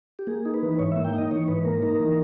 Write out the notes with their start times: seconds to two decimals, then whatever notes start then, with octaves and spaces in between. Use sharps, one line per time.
0.19 G4
0.27 A#3 G#4
0.45 D#4
0.54 B4
0.62 E3
0.79 G#2 C#5
0.92 A#3 E5
1.05 G5
1.14 D#4 D#5
1.31 E3 C#5
1.48 G#2 B4
1.65 A#3 A#4
1.82 D#4 A#4
2.00 E3